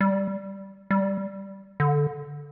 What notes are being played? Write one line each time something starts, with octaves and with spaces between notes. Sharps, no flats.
G3
G3
D3